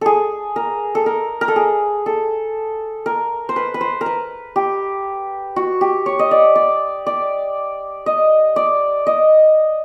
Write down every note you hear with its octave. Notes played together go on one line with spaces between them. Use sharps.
G#4 A4
A#4
A4
A#4
A#4
A4
G#4
A4
A#4
C5
B4
B4
C5
A#4
B4
G4
F#4
G4
C#5
D#5
D5
D5
D5
D#5
D5
D#5